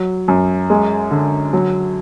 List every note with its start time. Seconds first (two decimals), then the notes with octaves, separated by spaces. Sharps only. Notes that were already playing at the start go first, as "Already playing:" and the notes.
Already playing: F#3
0.28 F#2
0.70 G#3
1.11 D3
1.53 F#3